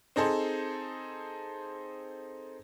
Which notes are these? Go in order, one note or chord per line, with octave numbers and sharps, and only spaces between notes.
C4 D#4 G#4 A4 C5